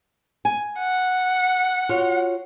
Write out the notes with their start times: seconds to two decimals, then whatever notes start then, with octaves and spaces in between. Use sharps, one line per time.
0.45 G#5
0.80 F#5
1.89 F4 F#4 C#5